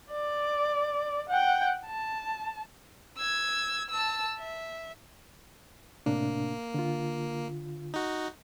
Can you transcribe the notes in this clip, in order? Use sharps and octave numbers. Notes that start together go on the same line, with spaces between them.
D5
F#5 G5
A5
E6 G#6
A5 E6
E5
A2 C3 A#3 D4
D3 F4
D#4 F#4